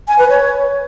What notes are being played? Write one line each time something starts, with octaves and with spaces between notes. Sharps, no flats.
G#5
B4
C#5